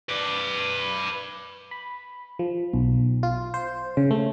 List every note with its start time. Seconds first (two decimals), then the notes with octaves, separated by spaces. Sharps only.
0.09 B4 D5
1.71 B5
2.39 F3
2.73 B1
3.23 F4
3.54 C5
3.97 C#3
4.11 A3